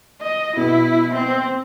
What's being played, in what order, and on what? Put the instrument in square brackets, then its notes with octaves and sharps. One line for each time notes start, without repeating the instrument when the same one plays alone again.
[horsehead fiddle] D#5
[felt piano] B2 [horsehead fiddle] E4
[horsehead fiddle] C4